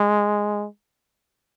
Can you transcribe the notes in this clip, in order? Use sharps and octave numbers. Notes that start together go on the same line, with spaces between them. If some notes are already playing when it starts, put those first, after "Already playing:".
Already playing: G#3